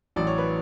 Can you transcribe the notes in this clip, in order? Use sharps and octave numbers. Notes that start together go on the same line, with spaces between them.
A1 A2 F#3 D5
C#5
B4